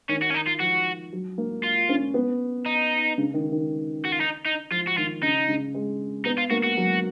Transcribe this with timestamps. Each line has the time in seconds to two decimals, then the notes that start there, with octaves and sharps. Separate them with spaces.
0.09 D#3 C#4
0.22 F#4
0.30 C#4
0.35 D#4
0.47 F4
0.60 F3 F#4
1.13 F#3
1.38 A#3
1.63 F4
1.89 C#4
2.14 B3
2.66 D#4
3.18 C#3
3.34 D#3
3.52 D#3
4.05 F#4
4.12 F4
4.21 D#4
4.45 D#4
4.71 F3 F4
4.87 F#4
4.98 D#3 F4
5.23 C#3 D#4
5.48 C#3
5.74 G#3
6.25 B3 D#4
6.38 F4
6.50 A#3 F#4
6.63 F#4
6.77 F#3